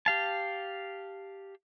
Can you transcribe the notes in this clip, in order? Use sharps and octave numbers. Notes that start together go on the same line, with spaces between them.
G4 F5 A5